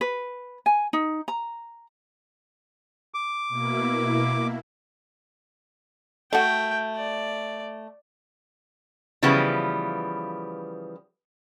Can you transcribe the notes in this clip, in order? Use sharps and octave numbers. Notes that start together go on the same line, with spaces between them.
B4
G#5
D#4
A#5
D6
B2 A#3 E4
A3 F#4 G5
D5
C#3 E3 F3 G3 B3